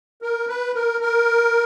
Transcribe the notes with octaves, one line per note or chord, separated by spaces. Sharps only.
A#4
B4
A#4
A#4